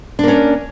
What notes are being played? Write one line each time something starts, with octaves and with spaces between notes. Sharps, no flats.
A#3 C#4 D4